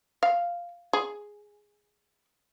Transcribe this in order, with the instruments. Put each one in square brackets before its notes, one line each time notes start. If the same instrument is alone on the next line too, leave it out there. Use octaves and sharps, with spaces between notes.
[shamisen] F5
G#4